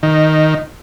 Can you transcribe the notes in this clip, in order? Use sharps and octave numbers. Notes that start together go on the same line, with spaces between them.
D#3